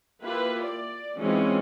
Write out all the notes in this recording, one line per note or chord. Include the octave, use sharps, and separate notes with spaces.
A#3 E4 F4 G4 B4
D5
E3 G#3 C4 C#4 D#4 F4